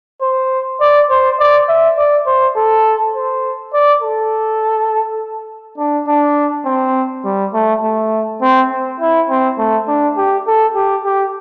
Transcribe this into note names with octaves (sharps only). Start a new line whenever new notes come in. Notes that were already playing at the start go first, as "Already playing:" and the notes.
C5
D5
C5
D5
E5
D5
C5
A4
C5
D5
A4
D4
D4
C4
G3
A3
A3
C4
C4
E4
C4
A3
D4
G4
A4
G4
G4